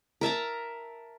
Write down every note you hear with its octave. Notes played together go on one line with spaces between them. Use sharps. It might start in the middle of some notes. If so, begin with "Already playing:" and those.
A#4 E5 A5 A#5